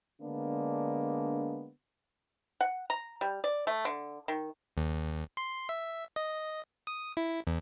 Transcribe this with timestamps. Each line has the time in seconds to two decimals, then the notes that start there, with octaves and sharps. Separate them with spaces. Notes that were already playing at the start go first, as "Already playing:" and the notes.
0.22 D3 G#3 A#3 B3 D4
2.61 F#5
2.90 A#5
3.21 G3
3.44 D5
3.67 A3
3.85 D3
4.28 D#3
4.77 D#2
5.37 C6
5.69 E5
6.16 D#5
6.87 D#6
7.17 E4
7.47 E2